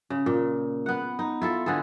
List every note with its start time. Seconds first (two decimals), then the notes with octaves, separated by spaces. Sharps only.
0.10 C#3
0.26 A#2
0.86 B3 F#5
1.19 D#4
1.42 E4 F4 A4
1.66 D3 B3 G#4 A4